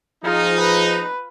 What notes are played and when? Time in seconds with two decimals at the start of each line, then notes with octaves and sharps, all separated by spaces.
0.25 F3 D#4 F4 G#4
0.61 B4